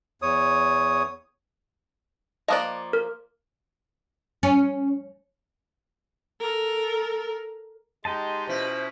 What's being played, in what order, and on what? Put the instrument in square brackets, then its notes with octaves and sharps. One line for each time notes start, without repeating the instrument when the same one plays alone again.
[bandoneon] E2 C#5 D#6
[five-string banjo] F3 A#3 D5 [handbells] D#5 D#6 F#6
[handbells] A#4
[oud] C#4
[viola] A4 A#4
[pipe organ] G#3 D#4 [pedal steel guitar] G4 D#5 A5 [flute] C6
[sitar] B2 E4 F4 [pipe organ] C#4 [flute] C5